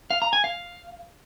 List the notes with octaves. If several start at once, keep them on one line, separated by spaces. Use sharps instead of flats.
F5
A#5
G#5
F5